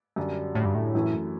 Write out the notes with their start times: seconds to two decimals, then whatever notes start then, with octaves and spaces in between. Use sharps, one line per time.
0.16 F#2 D3 G3 D4
0.55 A2
0.65 G2
0.75 A2
0.95 F#2 E3 A3 E4